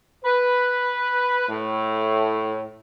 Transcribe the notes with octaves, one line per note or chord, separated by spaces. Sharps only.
B4
A2